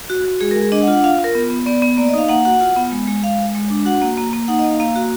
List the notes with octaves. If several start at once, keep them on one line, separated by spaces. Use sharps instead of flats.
F#4
F#4
G#3 G#4
A#4
G#3 G#4
D4 D#5
F#5
F4
F#5
F4 F5
F4
A#4
B3
B3
B3 D5
B3
A#3 D5
D#5
D#4 F5
A#3 F#5
F#4 F#5
F4 F#5
B3
G#3
G#3
G#3 F5
G#3
G#3
D4
F#4 F#5
A#3
A#3
A#3
D#4 F#5
D#5
A#3 F5
A#3 F5
F#4